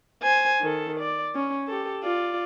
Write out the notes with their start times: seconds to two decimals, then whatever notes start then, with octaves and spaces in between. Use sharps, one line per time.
0.23 C5 G#5
0.61 D#3 A4
0.99 D5
1.35 C#4
1.68 G4 A4
2.03 F4 D5